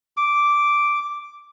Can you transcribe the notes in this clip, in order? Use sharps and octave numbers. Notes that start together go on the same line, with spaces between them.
D6